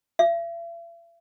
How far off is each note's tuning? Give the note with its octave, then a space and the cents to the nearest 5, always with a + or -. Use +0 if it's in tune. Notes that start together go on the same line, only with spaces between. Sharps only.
E5 +45